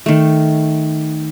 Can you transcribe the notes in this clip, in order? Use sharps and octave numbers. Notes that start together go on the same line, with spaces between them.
D#3 A3